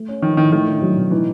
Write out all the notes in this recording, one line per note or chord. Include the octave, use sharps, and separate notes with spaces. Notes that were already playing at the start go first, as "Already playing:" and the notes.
Already playing: A3
C#4
D#3 F3
A2 D#3
D#3 A3
D4
F#3
B2
E3 D#4